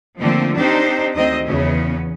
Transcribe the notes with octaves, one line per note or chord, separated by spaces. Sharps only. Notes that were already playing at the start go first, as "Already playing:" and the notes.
D3 F3 A3 A#3 C4
C4 D4 D#4 G4 C5
D2 D#3 C4 D#5
E2 C#3 B3 C#4